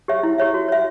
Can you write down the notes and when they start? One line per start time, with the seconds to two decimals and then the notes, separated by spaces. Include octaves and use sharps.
0.08 G4 C#5 E5
0.23 E4
0.38 G4 C#5 E5
0.54 F#4
0.68 C#5 E5